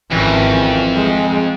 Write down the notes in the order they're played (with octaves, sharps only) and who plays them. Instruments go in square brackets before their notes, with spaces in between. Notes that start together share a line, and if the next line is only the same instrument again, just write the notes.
[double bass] G#1 C#4 [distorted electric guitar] F2 [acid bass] E3
[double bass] G#3